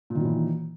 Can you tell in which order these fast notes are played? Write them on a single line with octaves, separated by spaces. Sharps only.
A#2 D#3 F#3 E3